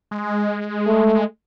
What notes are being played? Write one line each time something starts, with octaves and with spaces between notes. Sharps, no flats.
G#3
A3